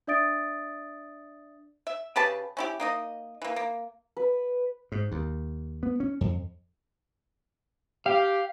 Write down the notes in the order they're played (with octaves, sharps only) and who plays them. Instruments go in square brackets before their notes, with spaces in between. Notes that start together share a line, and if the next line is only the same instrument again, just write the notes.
[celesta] D4 D5 E5 D#6 A6 D7
[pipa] E5
C#3 G4 B4 A5
C#4 E4 G4
A#3 D#4 D#5
E3 A#3
A#3
[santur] B4
[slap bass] G#2
D#2
B3
C#4
F2
[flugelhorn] G4 [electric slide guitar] F5